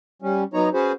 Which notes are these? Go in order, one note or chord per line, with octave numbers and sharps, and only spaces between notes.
G3 C#4
F#3 B3 D#4 C#5 A#5
C#4 F#4 G#4 B4 C5